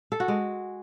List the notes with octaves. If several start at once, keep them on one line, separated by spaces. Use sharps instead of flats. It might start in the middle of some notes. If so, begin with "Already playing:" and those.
A4
F#4
G#3